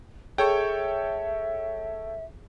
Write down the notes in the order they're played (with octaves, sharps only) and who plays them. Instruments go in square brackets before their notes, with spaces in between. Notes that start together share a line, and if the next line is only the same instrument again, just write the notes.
[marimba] G#4 C#6 [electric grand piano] A4 C#5 G5 [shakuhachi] E5